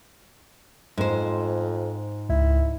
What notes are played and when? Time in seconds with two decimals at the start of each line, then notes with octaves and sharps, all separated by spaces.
0.97 F2 G#2 C5
2.29 C#2 E4